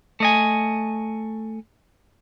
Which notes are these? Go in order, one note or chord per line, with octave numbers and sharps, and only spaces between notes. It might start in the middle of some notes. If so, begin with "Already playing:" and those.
A3 D#5 G#5